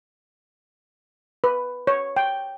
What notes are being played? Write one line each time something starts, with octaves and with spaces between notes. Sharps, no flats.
B4
C#5
G5